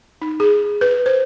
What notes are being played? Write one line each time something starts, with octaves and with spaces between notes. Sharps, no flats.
D#4
G#4
B4
C5